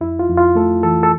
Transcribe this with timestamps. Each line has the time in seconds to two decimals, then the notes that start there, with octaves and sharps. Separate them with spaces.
0.01 F2 E4
0.19 F4
0.29 F2
0.38 F4
0.55 A3 A4
0.83 E3 A4
1.03 A4